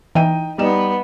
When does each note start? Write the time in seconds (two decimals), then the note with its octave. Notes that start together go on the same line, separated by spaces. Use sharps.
0.15 E3 D#4 G5 D#7
0.58 G3 B3 D#4 B4 E7